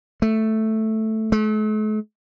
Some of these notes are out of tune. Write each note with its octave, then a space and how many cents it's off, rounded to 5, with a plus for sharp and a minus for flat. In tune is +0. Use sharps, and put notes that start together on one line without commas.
A3 +0
A3 -45